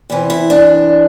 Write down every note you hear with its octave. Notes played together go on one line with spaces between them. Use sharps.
E2 C3 E3
E4
D4